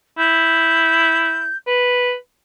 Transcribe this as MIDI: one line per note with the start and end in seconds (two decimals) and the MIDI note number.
0.18 1.50 64
0.18 1.57 91
1.67 2.14 71